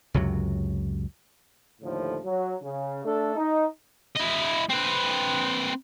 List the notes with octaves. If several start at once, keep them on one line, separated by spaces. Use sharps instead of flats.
C#2 F#2 C3 F#3
D#2 A2 D3 F3
F#3
C#3
A3 D4 A4
D#4
E4 D#5
C4 B4